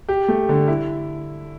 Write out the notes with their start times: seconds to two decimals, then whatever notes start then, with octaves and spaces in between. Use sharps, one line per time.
0.09 G4
0.28 A3
0.49 D3
0.68 E4